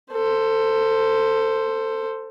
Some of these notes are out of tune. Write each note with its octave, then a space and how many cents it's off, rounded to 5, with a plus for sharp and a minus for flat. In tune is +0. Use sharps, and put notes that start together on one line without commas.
A4 +20 C5 +0